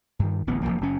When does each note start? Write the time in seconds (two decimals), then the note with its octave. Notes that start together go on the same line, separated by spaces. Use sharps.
0.19 G2 D#3
0.47 D1 A1 B3
0.63 F1 D#2 F3 A#3
0.81 F#1 F#2 C#4